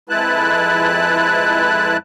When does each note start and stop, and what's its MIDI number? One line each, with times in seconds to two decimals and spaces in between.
0.09 1.97 41
0.09 1.97 56
0.09 1.97 64
0.09 1.97 71
0.09 1.97 81
0.09 1.97 90